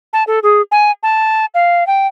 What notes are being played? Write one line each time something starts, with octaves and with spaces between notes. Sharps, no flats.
A5
A4
G#4
G#5
A5
F5
G5